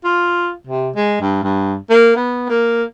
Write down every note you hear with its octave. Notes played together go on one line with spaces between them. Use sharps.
F4
C3
G#3
G2
G2
A#3
B3
A#3